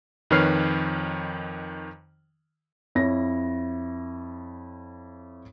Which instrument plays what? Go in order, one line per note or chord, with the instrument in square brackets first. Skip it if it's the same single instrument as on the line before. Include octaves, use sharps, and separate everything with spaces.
[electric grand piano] F2 D#3 B4 C#5 F6 C7
[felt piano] F2 E4 C#5 A#6